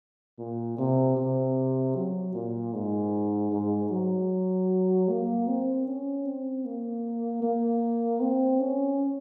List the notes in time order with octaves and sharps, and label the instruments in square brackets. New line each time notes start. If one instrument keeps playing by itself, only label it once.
[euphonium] A#2
C3
C3
F#3
A#2
G#2
G#2
F#3
A#3
C4
C#4
C4
A#3
A#3
C4
C#4